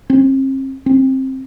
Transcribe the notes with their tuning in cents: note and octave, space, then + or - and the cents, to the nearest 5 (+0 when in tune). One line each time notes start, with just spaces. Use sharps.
C4 +40
C4 +20